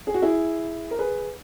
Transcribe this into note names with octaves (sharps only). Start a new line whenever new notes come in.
G#4
F#4
E4 G#4
A#4
G#4 B4